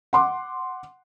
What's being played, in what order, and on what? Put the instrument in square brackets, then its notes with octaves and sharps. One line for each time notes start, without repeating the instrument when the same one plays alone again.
[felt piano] F#5 C6 D6